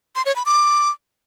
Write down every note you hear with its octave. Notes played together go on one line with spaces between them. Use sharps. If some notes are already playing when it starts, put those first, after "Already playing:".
C6
C#5
B5
D6